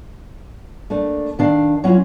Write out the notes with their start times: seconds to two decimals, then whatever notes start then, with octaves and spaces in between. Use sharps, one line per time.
0.90 A3 A#3 D4
1.39 D#3 D4 F5
1.84 F#3 C#4 E4 F4